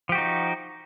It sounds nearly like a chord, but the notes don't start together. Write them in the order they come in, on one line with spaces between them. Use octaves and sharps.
F3 G4 F#4 D#4